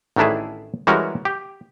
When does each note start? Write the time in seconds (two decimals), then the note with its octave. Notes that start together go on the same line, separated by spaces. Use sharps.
0.16 A1 D#3 A3 D4 E4 G#4
0.87 E3 G3 G#3 C#4 F#4 A#4
1.25 G4